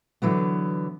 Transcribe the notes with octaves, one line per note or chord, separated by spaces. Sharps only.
D3 E3 F#3 B3